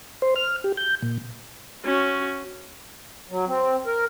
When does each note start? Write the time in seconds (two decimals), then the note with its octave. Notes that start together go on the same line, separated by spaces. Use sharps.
0.22 C5
0.36 F6
0.64 G4
0.77 G6
1.02 A#2
1.85 C#4 F#4
3.30 F#3
3.47 C4
3.86 A#4